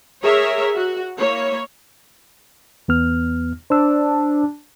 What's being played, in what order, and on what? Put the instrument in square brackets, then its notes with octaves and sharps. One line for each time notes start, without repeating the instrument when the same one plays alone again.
[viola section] G#4 A#4 C#5 E5
F#4
A#3 E4 C#5
[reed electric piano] E2 B3 F6
[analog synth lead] D4 [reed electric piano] C5 E6